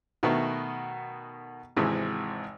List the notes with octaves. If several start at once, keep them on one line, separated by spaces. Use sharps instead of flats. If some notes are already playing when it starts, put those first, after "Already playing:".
B2 D#3 A3 B3 F#4
G#1 C3 E3 G#3